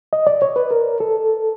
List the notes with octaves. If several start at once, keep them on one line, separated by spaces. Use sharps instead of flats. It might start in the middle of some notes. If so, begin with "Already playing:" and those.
D#5
D5
C#5
B4
A#4
A4